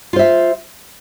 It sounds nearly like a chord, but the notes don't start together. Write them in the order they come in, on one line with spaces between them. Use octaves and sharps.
F4 C5 E5